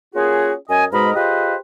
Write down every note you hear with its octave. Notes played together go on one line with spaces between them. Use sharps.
A#3 C#4 F4 F#4 G#4
F#2 D#5 G#5
G#2 B2 G#3 A#4 D#5 B5
F4 G4 G#4 B4 C5 D#5